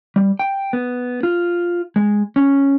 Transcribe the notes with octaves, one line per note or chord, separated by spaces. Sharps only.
G3
G5
B3
F4
G#3
C#4